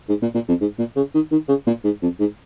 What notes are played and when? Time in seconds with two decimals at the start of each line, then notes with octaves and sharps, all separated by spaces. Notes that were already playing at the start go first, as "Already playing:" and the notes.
0.09 G#2
0.22 A#2
0.34 A#2
0.48 F2
0.61 G#2
0.79 A#2
0.96 C#3
1.14 D#3
1.32 D#3
1.49 C#3
1.67 A#2
1.84 G#2
2.02 F2
2.20 G#2